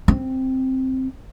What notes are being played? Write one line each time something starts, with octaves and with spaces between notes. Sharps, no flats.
C4